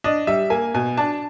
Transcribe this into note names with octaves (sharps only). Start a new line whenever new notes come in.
D4 D#5
G3 E5
A#3 G#5
B2 G#5
D4 A5